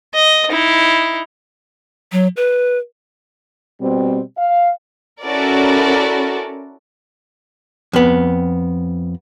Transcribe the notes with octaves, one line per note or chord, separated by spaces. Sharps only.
D#5
D#4 E4
F#3
B4
B2 G3 C4
F5
C#4 E4 F#4 A4 A#4 D5
F2 B3